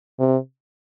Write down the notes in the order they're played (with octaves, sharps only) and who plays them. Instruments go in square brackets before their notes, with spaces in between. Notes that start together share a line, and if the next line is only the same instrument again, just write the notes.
[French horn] C3